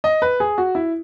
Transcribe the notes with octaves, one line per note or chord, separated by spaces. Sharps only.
D#5
B4
G#4
F#4
E4